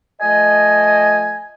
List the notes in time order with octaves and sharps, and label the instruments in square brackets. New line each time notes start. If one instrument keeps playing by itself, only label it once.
[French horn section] F3 A3 D#5 [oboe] G#5